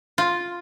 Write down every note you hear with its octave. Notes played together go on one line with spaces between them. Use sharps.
F4